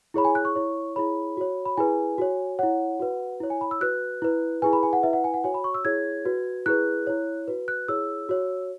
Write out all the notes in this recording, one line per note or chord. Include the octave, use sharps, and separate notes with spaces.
E4 G#4 C#5 B5
G#5
F#6
C#6
E4 C#5
E4 G#4 C#5 B5
F#4 C#5
B5
E4 G#4 B4 G#5
F#4 C#5
E4 C#5 F#5
F#4 B4
E4 C#5
G#5
B5
E6
F#4 B4 F#6
E4 B4
E4 G#4 B4 G#5
B5
G#5
F#5
E4 B4 E5
F#5
G#5
F#5
F#4 C#5 G#5
B5
C#6
E6
E4 G#4 C#5 G#6
F#4 B4
E4 G#4 B4 F#6
E4 C#5
F#4 B4
F#6
E4 G#4 C#5 E6
F#4 C#5